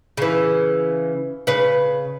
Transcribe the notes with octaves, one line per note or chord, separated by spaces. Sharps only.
C#3 E3
C#3 B4